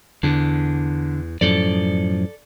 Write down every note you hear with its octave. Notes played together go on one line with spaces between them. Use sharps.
E2 D3
F#2 A2 F3 A4 D5